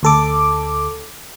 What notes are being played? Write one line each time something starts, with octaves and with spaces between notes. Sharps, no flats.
D2 A4 D6